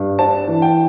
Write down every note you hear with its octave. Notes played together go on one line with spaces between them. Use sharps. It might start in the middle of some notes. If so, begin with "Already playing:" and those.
Already playing: G2
D4 A5
E3
G5